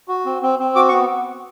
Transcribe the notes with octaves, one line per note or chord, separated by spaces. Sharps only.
F#4
C4
C4
C4
F#4 D6
C#6
B3